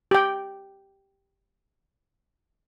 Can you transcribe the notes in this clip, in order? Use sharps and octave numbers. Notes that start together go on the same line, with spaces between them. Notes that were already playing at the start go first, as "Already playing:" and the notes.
G4 G5